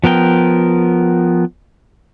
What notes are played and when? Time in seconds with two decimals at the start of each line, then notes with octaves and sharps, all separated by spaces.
0.04 F3 B3 A#4 G5